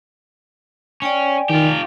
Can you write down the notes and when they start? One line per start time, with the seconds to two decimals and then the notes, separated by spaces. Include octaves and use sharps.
1.02 C#4 D5 G5 G#5
1.50 D#3 F4 G4